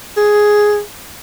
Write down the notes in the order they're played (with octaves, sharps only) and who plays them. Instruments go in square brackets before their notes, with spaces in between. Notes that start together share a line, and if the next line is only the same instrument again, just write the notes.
[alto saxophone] G#4